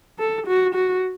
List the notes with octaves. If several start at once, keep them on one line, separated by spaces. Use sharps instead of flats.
A4
F#4
F#4